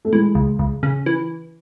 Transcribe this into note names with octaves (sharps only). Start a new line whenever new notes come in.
A3
E3 G#3
C#2
C#2
C#3
E3